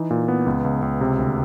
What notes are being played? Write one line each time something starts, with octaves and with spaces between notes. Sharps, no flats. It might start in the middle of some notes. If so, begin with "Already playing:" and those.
Already playing: E3 D#4
A#2
B3
C#2
C#2
C#2
C3
D2